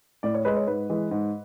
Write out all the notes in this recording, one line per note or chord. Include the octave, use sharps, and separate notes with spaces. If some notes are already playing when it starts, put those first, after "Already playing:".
A2 D5
C#5
G#3 B4
C#5
G#2 B4
E3 G#3
G#2